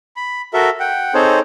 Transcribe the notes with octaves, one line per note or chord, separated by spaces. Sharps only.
B5
F#4 A4 A#4 E5
F#5 G5
C4 D#4 G#4 A4 C5 C#5